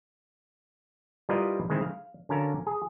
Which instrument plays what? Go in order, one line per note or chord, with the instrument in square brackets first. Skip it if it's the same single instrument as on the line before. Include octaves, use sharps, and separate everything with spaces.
[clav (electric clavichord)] G3 E4 F4 A#4 B4 D#5
D#3 G#3 C4 E4
F5
D3 C#4 F#4 A#4 F5 A5
G#4